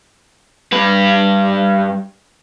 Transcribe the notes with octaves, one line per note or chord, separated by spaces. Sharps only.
G2 B4